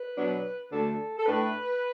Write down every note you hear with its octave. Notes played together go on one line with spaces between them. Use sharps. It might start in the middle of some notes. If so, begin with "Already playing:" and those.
Already playing: B4
B2 F#3 B3 D4
D2 D3 A3 D4 A4
A4
A2 A3 D4 B4